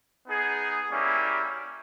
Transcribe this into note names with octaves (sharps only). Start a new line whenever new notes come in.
B3 D#4 G#4
G3 A#3 C#4 E4